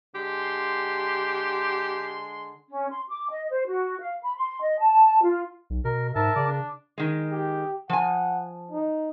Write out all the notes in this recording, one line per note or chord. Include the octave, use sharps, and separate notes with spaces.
D3 G#3 G4 C6
C#4
C6
D6
D#5
C5
F#4
F5
B5
C6
D#5
A5
F4
B1
B2 A#4
G#2 A#4 E5 A5
C#3 D5
D4
D#3 G#3
G4
F3 F#5 G#5
D#4